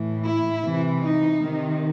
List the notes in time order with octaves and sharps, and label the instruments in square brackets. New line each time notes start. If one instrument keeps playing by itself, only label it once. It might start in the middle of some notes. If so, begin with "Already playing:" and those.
Already playing: [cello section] A2 E3
E4
C3 E3
D#4
C3 D#3